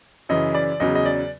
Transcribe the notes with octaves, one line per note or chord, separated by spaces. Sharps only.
F#2 C#3 E3 D#5
D5
E2 C#3 F#3 D#5
D#5
D5